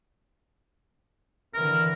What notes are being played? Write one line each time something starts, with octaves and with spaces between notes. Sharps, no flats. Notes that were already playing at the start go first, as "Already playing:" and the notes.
D3 E3 A#4